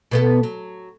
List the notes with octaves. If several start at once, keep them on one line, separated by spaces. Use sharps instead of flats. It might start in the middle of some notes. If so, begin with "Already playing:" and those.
B2 B3 A4
F#3